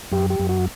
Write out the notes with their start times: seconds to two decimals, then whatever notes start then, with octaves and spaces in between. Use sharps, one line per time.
0.12 F#2 G4
0.30 G4
0.40 F#2
0.49 F#4